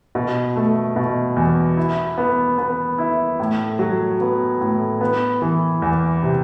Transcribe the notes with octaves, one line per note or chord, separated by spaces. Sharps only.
B2
A3
B2
E2
E4
B3
B3
E4
A2
F#3
B3
A2
B3
E3
E2
C3